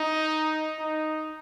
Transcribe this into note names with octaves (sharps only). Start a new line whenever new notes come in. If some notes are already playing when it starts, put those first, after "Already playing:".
Already playing: D#4
D#4